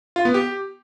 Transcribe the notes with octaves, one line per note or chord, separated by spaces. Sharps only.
F4
B3
G4